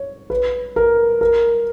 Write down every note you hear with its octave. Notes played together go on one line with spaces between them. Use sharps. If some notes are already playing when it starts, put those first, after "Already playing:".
Already playing: C#5
B4
A#4
A#4